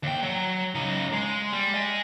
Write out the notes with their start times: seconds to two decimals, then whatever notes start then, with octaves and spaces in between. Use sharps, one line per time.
0.03 D#2 G5
0.23 F#3
0.75 C#3 D#4
1.12 G#3
1.53 G3
1.74 D#5 G#5